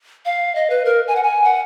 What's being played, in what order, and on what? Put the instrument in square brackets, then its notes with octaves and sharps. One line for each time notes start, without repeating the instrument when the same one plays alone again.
[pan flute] F5
D#5
B4
A#4
G#5
F#5
G#5
F#5